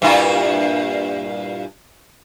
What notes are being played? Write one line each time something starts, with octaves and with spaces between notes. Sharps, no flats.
G2 A#2 E4